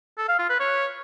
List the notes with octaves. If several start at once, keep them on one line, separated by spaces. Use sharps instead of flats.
A4
F5
F4
B4
C#5